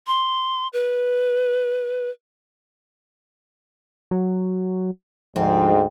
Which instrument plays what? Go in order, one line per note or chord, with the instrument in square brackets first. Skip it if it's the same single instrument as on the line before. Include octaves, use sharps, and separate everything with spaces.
[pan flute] C6
B4
[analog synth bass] F#3
[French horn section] D2 G#2 [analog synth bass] F3 [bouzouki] C4